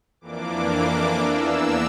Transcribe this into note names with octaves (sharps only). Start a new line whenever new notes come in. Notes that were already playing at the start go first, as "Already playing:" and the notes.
F2 E3 A#3 D4 D6
E2 E3 A#3 D4 E6